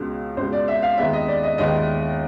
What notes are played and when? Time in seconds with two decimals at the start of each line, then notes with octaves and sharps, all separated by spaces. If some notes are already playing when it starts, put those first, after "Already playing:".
Already playing: C#2 B2 G#3
0.37 C#2 B2 G#3 C5
0.53 D5
0.68 E5
0.82 F5
0.97 D#2 D#3 G#3 B3 E5
1.13 D#5
1.28 D5
1.43 D#5
1.58 D#2 D#3 G#3 B3 D#5